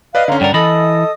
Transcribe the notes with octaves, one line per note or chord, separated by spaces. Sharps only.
B4 D5 D#5 F5 F#6
D3 C#4 F5 A#5 C6
G2 A#4 D5 F#5 G5
E3 A4 D#5 B5 D#6 A6 A#6